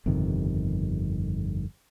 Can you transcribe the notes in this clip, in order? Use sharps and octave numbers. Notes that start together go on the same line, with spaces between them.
G1 F2 C3 D#3